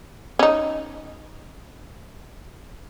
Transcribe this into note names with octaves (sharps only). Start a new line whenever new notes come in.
C#4 D#4